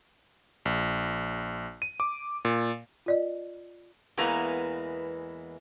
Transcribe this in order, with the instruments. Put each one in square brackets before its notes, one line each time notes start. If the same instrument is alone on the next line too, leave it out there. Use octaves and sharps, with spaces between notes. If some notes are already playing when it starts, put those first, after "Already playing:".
[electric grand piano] A#1
D#7
D6
A#2
[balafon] F4 D5 D#5
[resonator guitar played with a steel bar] E2 E3 G#3 A#3 B3 A#5